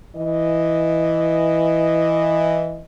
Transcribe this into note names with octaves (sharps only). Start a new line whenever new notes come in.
E3 D#5